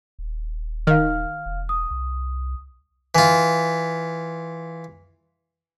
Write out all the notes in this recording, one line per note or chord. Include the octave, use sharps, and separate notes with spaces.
D#1
D#3 F5 F6
E1
D#6
C2
E3 F4